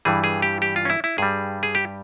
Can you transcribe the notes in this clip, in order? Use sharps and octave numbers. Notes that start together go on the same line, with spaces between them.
G2 E3 G3 G#4
G#4
G4
G4
F4
C#4
E4
E4
G2 G3 G#4
G#4
G4